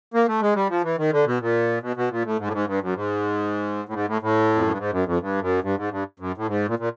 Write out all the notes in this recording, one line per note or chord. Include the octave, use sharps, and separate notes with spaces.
A#3
A3
G#3
G3
F3
E3
D#3
D3
B2
A#2
B2
B2
A#2
A2
G#2
A2
G#2
G2
F#2
G#2
A2
G#2
A2
A2
F2
F#2
G2
G#2
F#2
F2
G2
F#2
G2
G#2
G2
F#2
A2
G#2
A#2
A#2